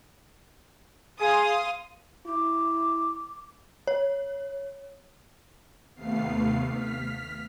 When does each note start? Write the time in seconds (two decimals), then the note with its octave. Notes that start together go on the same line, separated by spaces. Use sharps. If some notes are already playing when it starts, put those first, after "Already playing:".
1.19 G#4 F5 C6 D#6
2.26 E4 D6
3.87 C#5
5.95 D#2 C3 A3 B3 F5 C7
6.69 F6 B6